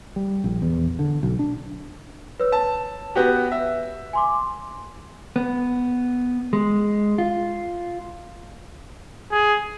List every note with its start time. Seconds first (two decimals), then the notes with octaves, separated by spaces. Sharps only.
0.16 G3
0.44 A#1
0.62 E2
0.99 D3
1.23 B1
1.39 D4
2.40 B4 C#5 E6
2.52 A5
3.15 B3 F#4 G4
3.52 E5
4.13 G#5 C6 D6
5.36 B3
6.53 G#3
7.18 F4
9.31 G#4